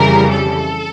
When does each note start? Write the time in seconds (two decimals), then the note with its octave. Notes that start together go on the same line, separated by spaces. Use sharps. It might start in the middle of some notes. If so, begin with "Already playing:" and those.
Already playing: F2 C#3 E3 G3 A#4
0.32 A4